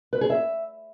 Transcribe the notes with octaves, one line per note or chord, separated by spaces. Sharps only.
B4
G#4
E5